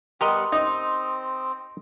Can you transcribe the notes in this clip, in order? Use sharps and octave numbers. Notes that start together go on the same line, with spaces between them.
G3 B3 G4 A#4 D#5 F#5 C6 D#6
C4 D#4